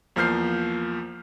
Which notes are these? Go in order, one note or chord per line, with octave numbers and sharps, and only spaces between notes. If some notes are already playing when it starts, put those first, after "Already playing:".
E2 F3 A#3 F6 G6 C7